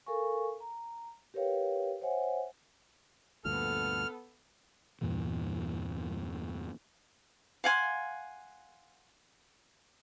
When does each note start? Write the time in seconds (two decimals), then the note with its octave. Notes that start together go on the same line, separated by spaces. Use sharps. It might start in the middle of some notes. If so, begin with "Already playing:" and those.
0.06 A4 A#4 F5 G#5 C#6
0.60 A#5
1.34 G4 A#4 B4 C#5 F5 G5
2.01 C5 C#5 E5 F#5 G#5
3.45 D2 G2 A#2 B3 A4 F6
5.01 E2 G2 A#2 E3
7.64 F5 F#5 G#5 C6